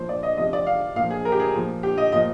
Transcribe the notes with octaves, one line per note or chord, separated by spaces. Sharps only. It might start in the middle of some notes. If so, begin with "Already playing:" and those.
Already playing: A#2 F3 C5
D5
D#5
C3 F3 D#5
D5
F5
A#2 F3 F5
G#4
A#4
G4
G#4
A#2 F3
G4
D#5
A#2 F3 D#5